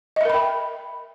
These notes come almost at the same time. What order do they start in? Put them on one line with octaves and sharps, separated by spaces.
D#5 E5 A#4 B5 G5